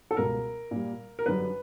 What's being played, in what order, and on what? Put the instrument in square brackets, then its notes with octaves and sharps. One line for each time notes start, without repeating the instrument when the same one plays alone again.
[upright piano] A4
C#2 B2 G3 A#4
A#2 G3
A#4
F#2 D3 G3 B4